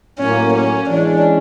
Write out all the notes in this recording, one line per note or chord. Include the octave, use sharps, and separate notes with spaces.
A2 F#3 A#3 C#4
C#4
E3 G#3 C#4 D4